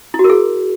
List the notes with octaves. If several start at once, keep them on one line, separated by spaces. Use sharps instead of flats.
E4
F#4
A#4
G#4